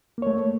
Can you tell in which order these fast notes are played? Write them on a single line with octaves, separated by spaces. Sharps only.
A#3 C#5 A3